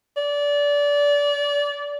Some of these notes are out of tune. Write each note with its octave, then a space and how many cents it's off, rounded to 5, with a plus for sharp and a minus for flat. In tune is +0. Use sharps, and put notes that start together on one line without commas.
D5 -25